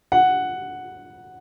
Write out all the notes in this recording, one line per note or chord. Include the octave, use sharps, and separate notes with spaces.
F#5